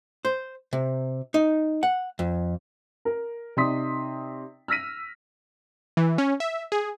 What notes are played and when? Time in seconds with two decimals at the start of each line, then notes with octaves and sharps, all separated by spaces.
0.25 C5
0.73 C3
1.34 D#4
1.83 F#5
2.19 F2
3.05 A#4
3.57 C3 D#4 D5 C6 D#6 B6
4.68 E6 F6 A#6 B6 D#7
5.97 E3
6.18 C#4
6.40 E5
6.72 G#4